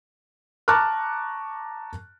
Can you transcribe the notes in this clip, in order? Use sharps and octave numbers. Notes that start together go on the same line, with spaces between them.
A5 A#5 C#6 D6 F6 F#6